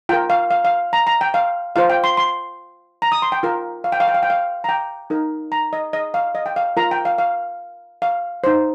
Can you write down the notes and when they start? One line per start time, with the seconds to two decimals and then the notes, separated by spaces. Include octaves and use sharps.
0.09 F4 A#4 G5
0.30 F5
0.51 F5
0.65 F5
0.93 A#5
1.07 A#5
1.21 G5
1.34 F5
1.76 F4 C5 F5
1.90 G5
2.04 C6
2.17 C6
3.02 A#5
3.12 D#6
3.22 C6
3.32 G5
3.43 F4 A#4
3.84 F5
3.92 G5
4.00 F5
4.08 G5
4.14 F5
4.23 G5
4.30 F5
4.64 A#5
4.69 G5
5.10 D#4 A#4
5.52 A#5
5.73 D#5
5.93 D#5
6.14 F5
6.35 D#5
6.46 G5
6.56 F5
6.77 F4 A#4 A#5
6.91 G5
7.05 F5
7.18 F5
8.02 F5
8.44 D#4 C5